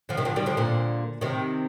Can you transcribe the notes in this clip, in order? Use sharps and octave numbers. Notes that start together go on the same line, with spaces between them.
D3 F3
C3 D#3
D3 F3
D#3 G3
D3 F3
A#2 D3
C3 D#3